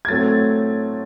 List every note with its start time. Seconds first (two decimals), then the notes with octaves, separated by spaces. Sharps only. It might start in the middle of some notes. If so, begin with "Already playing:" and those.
0.05 G#6
0.08 A2 F#3 A3 C4 A6